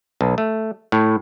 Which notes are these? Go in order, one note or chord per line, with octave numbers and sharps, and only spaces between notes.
B1
A3
A2